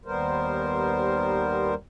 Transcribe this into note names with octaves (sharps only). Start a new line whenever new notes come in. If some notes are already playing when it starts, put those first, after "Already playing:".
D#2 G3 B3 A#4 C5